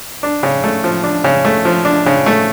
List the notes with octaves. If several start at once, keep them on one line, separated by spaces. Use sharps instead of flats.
D4
C#3
A3
F3
D4
C#3
A3
F3
D4
C#3
A3